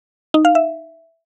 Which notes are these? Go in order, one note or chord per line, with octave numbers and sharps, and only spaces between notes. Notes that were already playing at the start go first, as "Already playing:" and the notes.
D#4
F5
E5